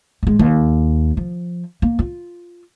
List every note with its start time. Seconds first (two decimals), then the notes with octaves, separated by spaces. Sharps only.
0.23 A1 G#3
0.39 D#2
1.17 F3
1.82 A#3
1.99 F4